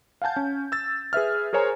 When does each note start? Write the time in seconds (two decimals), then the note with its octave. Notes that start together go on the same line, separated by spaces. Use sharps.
0.22 F5 F#5 G#5 A5 G6
0.36 C#4
0.72 E6 A6
1.13 G#4 B4 E5 F6
1.53 G#4 A#4 C5 C#5 G#5 A#5